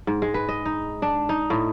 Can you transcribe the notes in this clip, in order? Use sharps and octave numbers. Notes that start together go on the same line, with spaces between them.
G#2
G#3
B4
D#5
D#4
D4
D#4
A2